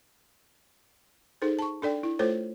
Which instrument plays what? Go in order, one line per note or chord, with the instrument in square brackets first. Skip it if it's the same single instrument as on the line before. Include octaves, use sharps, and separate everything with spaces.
[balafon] D#4 G#4 A4 C5
A5 C#6
D4 A4 D5 G5
E4
A3 F4 A4 C5 C#5